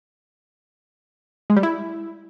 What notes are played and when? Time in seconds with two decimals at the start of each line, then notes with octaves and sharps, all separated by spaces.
1.50 G#3
1.56 G3
1.63 E4